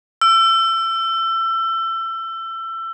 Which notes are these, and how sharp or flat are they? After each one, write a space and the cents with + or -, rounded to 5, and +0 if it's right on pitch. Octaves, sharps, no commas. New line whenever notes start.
E6 +25